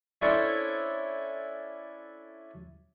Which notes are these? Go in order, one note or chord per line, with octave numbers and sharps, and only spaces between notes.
C#4 D4 E4 A4 C5 C#5